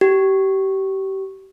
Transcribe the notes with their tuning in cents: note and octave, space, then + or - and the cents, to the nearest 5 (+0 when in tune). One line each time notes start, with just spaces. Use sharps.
G4 -30